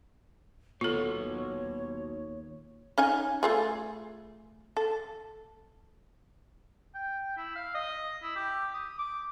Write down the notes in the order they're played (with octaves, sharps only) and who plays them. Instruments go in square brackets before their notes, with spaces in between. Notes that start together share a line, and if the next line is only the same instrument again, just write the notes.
[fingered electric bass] D#2 A#2 [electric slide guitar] B3 D#4 F#4 [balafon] F4 A4 [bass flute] C#5
[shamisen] C#4 D#4 G#5
A3 F4 G#4
A4
[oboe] G5
E4
F5
D#5
E4
G4
D#6
D6